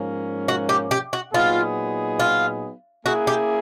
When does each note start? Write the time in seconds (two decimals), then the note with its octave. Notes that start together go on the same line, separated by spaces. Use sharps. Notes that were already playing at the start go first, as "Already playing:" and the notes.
Already playing: G#2 F3 A#3 C#4
0.48 F#4
0.69 G4
0.91 G4
1.13 F#4
1.33 A#2 F#3 B3 D#4 F4 G#4
2.20 F4
3.05 A#3 C#4 E4 F#4 G#4
3.27 G4